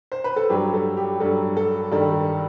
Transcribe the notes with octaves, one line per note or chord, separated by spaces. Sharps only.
C5
B4
A4
G2 F#3 G4
A4
G4
G2 F#3 A4
A4
G2 D#3 G3 A4